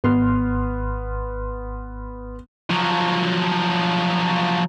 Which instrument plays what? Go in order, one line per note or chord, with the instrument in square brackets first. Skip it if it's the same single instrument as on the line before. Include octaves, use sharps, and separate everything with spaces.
[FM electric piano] G#1 C6 F6 [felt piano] B3
[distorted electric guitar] F3 F#3